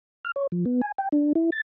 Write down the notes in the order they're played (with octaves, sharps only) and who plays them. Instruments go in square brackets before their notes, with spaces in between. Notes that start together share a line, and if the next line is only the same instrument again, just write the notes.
[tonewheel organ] F6
C#5
F3
B3
G#5
G5
D4
E4
A6